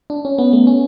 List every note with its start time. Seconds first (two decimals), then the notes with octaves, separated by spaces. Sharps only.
0.10 D4
0.25 C#4
0.38 B3
0.53 A3
0.67 C#4